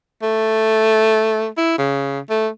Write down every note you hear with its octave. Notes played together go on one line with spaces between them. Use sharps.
A3
E4
C#3
A3